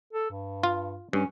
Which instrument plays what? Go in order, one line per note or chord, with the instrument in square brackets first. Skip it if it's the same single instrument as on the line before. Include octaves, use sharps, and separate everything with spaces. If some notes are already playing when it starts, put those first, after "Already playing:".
[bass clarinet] A4
G2
[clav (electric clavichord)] F4
[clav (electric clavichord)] G2 [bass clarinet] C#4